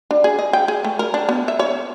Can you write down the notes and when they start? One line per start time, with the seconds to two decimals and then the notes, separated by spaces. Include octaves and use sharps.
0.11 D4
0.24 G#4
0.39 D#5
0.53 G5
0.68 G#4
0.84 A3
0.99 A#4
1.14 D4
1.29 B3
1.48 E5
1.59 C#5